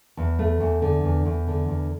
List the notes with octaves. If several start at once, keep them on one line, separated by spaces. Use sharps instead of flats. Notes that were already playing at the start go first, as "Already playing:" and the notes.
E2
A3
E2
D3
E2
E2
D3
E2